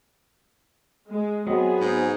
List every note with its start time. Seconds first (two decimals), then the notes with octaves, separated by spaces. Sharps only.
1.10 G#3
1.47 F#3 B3 C4 G#4 D#5
1.80 G#2